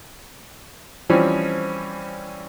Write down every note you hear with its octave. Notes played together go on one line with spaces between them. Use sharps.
E3 F3 G3 C4 C#4